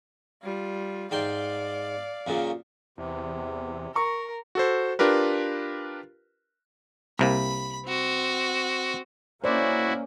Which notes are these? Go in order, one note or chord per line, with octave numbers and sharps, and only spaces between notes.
G3 F4
G#2 D5 F5 G5 C6
F#2 A#2 C#3
E2 C3
A#4 A#5 C#6
F#4 A4 C5
D4 F4 G4 A#4 B4
C2 C3 A#3 B5
C4 F#4
A#3 C#4 E4 F#4 C5 D5